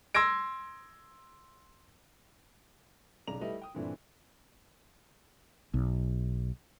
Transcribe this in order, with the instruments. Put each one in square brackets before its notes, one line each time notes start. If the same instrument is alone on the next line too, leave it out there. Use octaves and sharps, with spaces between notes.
[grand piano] C6 E6 G#6 A#6 D7
B1 C#3 D5 A#5 F7
G3 A3 E4 A4 B4 D#5
G5 D#6
G2 A#2 E3 A3 C4 D4
[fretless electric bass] B1